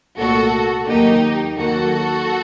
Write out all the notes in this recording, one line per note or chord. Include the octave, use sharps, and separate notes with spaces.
C2 A#2 A3 F#4 A4
D#2 D#3 F#3 A#3 D#4 G4
D#2 D#3 F#3 A#3 F#4 A4